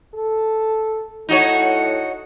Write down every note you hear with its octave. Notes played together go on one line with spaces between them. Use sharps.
A4
A2 D#4 F#4 C#5